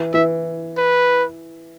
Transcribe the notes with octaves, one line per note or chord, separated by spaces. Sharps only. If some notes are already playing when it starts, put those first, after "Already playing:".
Already playing: E3
E3 E5
B4